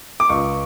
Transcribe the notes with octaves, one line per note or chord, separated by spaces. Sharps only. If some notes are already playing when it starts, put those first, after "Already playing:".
D6
C#2 C#6